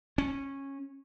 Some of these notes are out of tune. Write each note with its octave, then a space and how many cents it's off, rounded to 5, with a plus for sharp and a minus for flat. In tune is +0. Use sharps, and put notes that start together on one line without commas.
C#4 -15